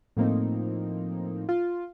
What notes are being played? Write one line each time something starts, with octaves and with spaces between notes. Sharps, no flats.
A2 F3 A#3 C4 D#4
F4